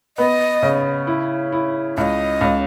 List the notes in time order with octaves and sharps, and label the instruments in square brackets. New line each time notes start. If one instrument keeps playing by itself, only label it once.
[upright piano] B3 [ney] D#5
[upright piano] C#3
E4
E4
[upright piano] C#2 [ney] D#5 E5
[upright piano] C#2